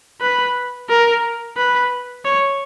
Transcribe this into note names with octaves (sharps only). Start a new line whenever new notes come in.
B4
A#4
B4
C#5